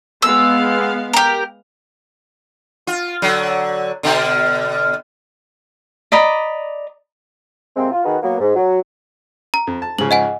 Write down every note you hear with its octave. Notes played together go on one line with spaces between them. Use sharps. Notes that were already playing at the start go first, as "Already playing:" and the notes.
G#3 B3 F5 E6
G4 A#4
F4
D3 F#3
B2 D3
D5 D#5 A#5 B5
C3 G#3 A#3 C4
F4
D#3 D#4 F#4 G#4 B4
F#3 A#3 B3
G#2
F#3
A#5
F2
A5
G#2 C#3 F3 F#7
D#5 F#5 G#5